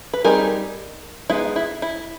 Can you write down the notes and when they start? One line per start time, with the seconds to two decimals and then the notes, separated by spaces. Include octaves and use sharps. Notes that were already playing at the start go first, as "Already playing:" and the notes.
0.13 B4
0.24 G3 C4 D#4 G#4 A#4
1.30 G#3 B3 D#4 E4
1.56 E4
1.82 E4